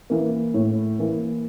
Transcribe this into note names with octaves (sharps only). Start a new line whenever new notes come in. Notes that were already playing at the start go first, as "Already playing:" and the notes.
E3 A#3
A2
E3 A#3